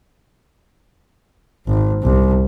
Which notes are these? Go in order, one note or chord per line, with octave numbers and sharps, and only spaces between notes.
G#1
C2